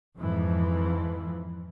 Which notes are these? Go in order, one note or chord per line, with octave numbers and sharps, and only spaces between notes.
F2 G#2 E3 F3